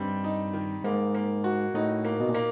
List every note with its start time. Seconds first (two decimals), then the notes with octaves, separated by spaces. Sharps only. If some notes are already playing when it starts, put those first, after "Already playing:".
Already playing: G2 D#3 G3 C4
0.24 D#4
0.53 D#3
0.84 G#2 A#3
1.15 A#3
1.44 F#4
1.74 A2 D#4
2.05 A#3
2.20 B2
2.29 A#2
2.35 A#3